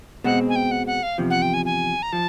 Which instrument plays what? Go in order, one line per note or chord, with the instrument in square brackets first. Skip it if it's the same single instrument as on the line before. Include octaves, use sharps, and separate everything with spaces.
[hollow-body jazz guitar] B2 G#3 C4 [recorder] F#5
[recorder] G#5
G5
F#5
F#5
F5
[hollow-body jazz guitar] E2 C3 F3
[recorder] F#5
G5
G#5
G#5
A#5
[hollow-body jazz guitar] F3 [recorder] A5